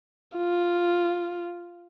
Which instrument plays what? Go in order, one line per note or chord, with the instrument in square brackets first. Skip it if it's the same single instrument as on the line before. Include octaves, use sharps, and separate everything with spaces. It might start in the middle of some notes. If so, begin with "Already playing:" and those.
[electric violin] F4